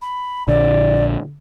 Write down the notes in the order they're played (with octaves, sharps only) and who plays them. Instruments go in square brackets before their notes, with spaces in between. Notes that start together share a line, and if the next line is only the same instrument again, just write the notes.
[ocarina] B5
[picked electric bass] A#1 D3 [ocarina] D5